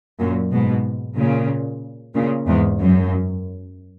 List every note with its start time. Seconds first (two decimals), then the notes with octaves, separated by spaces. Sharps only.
0.20 F#2 A#2
0.52 G#2 B2
1.17 A#2 C#3
2.15 A#2 C#3
2.47 E2 G#2
2.80 F#2